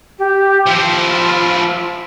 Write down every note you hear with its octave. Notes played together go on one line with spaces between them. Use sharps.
G4
F3 E4 F4